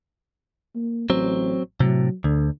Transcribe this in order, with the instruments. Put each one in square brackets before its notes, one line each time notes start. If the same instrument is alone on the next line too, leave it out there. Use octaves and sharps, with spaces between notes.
[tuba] A#3
[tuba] A1 [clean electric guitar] F#3 C4
[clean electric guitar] A2 C3 [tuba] F#3
[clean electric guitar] D2 [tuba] D3